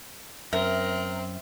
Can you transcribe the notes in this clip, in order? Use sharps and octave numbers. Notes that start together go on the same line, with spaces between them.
F#2 C4 A#4 E5